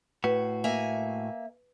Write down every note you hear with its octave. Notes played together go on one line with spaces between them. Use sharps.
A2 F#4 B4
A#3 E5 G#5